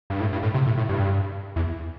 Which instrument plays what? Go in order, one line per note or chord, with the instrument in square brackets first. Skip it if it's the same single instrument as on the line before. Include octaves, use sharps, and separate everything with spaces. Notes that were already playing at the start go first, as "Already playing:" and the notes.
[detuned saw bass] G2
A2
G2
A2
C3
A2
A2
G2
E2